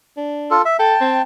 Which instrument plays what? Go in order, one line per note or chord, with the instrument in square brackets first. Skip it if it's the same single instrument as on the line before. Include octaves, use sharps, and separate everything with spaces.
[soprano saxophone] D4
[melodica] F4 A4
E5
[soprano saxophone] A4 [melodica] G5 A5
[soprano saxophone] C4